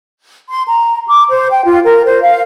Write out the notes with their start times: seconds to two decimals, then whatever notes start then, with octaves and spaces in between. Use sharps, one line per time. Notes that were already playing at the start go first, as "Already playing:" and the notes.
0.48 C6
0.66 A#5
1.07 D6
1.29 C5
1.50 G5
1.64 F4
1.84 A#4
2.04 C5
2.21 F5